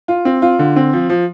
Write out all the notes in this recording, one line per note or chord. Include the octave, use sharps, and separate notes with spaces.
F4
C4
F4
D3
C4
F3
F3